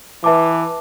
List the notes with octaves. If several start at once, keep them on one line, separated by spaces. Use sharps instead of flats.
E3 B4 E5 A5 D6